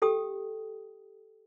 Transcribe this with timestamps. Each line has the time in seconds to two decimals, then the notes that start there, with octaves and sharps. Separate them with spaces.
0.02 G4 A4 G5 D#6